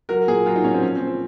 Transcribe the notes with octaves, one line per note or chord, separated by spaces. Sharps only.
F#3 A#4
A#2 G#4
F#3 F4
D#4
A#2 C#4
C4
F3 C#4
C4
A#2
C4